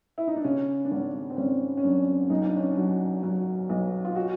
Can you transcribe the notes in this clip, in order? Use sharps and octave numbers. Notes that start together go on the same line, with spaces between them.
E4
D#4
D4
C#3 C#4
D4
G#1 C#4
C4
G#1 C#4
C#4
F#2 D4
B1 D#4
D4
C#4
D4
F#3
F#3
B1
F4
F#4